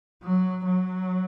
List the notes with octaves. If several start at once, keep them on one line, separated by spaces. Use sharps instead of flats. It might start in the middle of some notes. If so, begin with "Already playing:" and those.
F#3
F#3